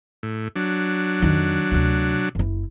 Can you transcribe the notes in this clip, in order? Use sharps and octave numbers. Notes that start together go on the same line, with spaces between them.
A2
F#3 D4
F2 D#3
D2 C3
F#1 E4